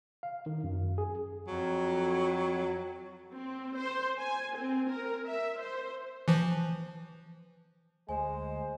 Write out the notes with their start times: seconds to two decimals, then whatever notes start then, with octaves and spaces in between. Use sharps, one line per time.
0.23 F5
0.46 D#3
0.64 F#2
0.98 G#4
1.47 F2 F#3
3.34 C4
3.77 C5
4.19 G#5
4.57 C4
4.89 A#4
5.26 E5
5.61 C5
6.28 E3 F3
8.09 D2 G#3 C5 G#5